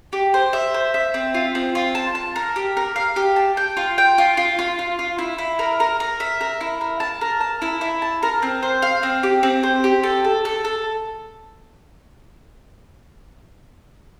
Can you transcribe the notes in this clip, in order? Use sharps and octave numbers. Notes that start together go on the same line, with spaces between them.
G4
C5
E5
C5
E5
C4
F4
C4
F4
A5
A5
A#4
G4
A#4
F5
G4
A5
G5
F4
G5
F4
F4
F4
F4
F4
E4
E4
A#4
A#4
A#4
E5
A#4
E4
A#4
A5
A#4
A5
E4
E4
A5
A#4
C4
C5
F5
C4
G4
C4
C5
G4
A4
A4
A4
A4